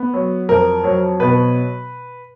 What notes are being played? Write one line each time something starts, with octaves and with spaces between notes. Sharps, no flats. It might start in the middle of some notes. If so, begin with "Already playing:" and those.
Already playing: B3
F#3
F2 A#4
F#3
B2 B4